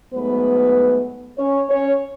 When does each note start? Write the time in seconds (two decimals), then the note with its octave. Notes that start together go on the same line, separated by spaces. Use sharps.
0.13 G#2 F#3 A3 B3 B4
1.38 C#4 C#5
1.70 C#4 C#5